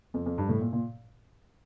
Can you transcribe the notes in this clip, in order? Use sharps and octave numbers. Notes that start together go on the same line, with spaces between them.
F2
F2
G2
A2
A#2
A#2